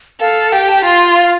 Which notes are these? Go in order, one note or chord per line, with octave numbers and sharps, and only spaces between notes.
A4 F5
G4 G5
A5
F4 C6
F5